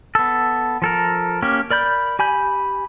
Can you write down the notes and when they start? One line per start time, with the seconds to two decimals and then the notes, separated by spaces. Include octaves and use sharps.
0.15 B3 A4
0.82 F3 A4 A#4
1.42 A#3 C#4 G4
1.70 A#4 D5 B5 G6
2.19 G4 G#5 B5 G6